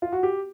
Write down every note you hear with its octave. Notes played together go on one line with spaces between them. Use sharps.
F4
F#4
G4